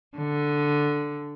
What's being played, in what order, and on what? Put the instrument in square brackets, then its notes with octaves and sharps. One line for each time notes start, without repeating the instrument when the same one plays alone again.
[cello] D3